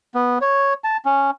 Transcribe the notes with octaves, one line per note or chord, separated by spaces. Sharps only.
B3
C#5
A5
C#4